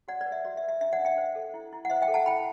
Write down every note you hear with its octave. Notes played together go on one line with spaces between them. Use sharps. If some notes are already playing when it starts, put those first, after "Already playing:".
F#4 D5 F#5
D5
B4
E5
F#4 D5
E5
B4
E5
D4 E5
D5 F#5
D4
E5 G5
C5
A4
E4
E4
F#5
C5 E5
E5 G5
A4
F#5 A5
E4 G5 B5